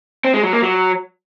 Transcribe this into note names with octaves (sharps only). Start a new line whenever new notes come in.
C4
G#3
F#3
A#3
F#3